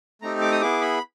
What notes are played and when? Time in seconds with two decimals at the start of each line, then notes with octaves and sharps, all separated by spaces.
0.22 A3 C4 D#4 G4 A#5
0.41 D6
0.52 D#6
0.62 B3 E4 G#4 D6
0.81 B5